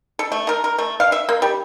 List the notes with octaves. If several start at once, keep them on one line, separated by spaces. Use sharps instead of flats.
A4
A3
A#4
A#4
A3
F5
E5
A#3
G3